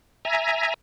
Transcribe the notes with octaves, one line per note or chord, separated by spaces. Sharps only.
E5 G#5 A#5